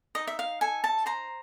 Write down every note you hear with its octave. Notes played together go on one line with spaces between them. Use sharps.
D#4 D#5
E5
F5
A4 G#5
A5
C5 A#5